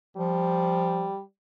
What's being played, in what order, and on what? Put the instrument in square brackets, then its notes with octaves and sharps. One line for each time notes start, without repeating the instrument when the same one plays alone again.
[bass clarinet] F3 [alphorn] G3